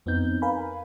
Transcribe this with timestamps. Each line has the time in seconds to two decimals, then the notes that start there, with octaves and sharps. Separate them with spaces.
0.06 F2 B3 C4 D#4 G6
0.42 A#4 B4 F5 G#5 B5